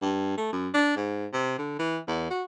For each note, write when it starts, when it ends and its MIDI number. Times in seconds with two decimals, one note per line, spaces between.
0.02 0.37 43
0.38 0.49 57
0.53 0.69 42
0.74 0.95 62
0.96 1.26 44
1.33 1.58 48
1.58 1.78 50
1.79 1.98 52
2.08 2.30 40
2.31 2.43 66